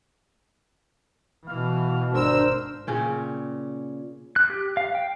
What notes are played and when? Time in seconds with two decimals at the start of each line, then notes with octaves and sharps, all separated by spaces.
1.48 B2 E3 F5
2.14 G#1 D4 A#4 C5 E6
2.87 A#2 C#3 C#4 G5
4.36 F#6
4.50 G4
4.77 F5
4.95 G5